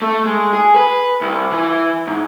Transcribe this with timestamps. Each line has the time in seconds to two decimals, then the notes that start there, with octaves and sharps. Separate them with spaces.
0.02 A3
0.26 G#3
0.53 G#4
0.76 B4
1.21 C2
1.52 E3
2.07 G#2